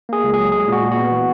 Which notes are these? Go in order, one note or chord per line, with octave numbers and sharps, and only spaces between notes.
A#3 G#4
C#2
F#3 G#4
G#3 G#4
A#2 F#4
A#2
B3 F#4
E3